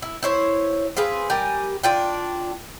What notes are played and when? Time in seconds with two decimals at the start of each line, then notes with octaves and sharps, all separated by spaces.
0.02 E4
0.23 E4 C5 C#5
0.97 C4 F4 G#4 B4
1.30 G3 G4 A#4 G#5
1.83 D4 F4 G5